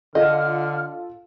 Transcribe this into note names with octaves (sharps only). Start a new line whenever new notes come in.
D3 F4 A4 D#5 F#5 F6